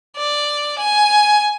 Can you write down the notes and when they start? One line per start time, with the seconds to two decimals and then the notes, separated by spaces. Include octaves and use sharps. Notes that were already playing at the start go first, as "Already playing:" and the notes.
0.17 D5
0.78 G#5